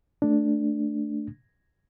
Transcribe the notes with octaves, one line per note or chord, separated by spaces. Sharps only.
A3 D4